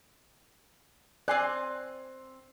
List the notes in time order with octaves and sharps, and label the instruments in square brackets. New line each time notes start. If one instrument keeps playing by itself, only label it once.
[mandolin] C4 C6 F#6 [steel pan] D5 G#5